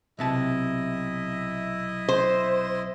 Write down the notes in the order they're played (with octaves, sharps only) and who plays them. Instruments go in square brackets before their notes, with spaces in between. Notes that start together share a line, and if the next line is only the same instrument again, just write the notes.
[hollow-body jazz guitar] B1 C3 A5 [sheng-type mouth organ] E4 D#5 E5
[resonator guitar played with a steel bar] C5